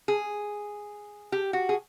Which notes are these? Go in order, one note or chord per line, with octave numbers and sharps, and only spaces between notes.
G#4
G4
F#4
G#4